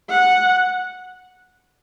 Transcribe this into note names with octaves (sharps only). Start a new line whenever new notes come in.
F#5